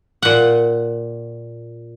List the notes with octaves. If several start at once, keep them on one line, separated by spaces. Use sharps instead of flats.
A#2 F#5